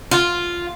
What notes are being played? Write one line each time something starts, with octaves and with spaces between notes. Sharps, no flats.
F4